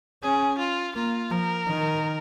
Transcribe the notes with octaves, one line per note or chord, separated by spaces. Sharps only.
C#4 G#4
F4
A#3 F4
F3 A#4
D#3